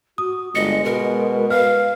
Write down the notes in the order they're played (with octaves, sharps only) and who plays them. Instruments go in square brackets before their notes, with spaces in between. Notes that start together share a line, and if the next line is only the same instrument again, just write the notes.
[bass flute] F#4 [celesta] D#6
[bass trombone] G1 [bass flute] G#3 [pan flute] D#5 [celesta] C#7
[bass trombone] B2 [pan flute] A#4
[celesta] B4 F6 [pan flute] F5